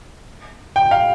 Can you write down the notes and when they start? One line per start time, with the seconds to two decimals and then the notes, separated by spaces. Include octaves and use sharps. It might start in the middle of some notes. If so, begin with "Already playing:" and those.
0.76 G5
0.91 F5